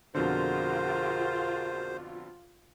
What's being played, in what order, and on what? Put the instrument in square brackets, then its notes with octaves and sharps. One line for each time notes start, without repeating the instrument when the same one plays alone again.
[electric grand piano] F2 B2 D3 [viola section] F4 [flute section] F#4 G#4 A#4 [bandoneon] C5